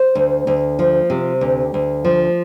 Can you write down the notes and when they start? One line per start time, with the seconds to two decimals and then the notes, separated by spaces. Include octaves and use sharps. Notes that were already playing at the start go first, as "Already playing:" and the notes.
Already playing: C5
0.15 D2
0.47 D2
0.79 F3
1.10 C3
1.41 D2
1.74 D2
2.05 F3